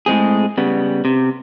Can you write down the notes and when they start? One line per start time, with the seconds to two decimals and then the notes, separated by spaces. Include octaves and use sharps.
0.06 A2 G#3 C4 G#4
0.58 C#3 G3 B3
1.05 C3